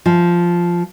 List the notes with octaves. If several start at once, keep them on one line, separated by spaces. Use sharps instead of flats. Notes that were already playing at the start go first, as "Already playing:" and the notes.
F3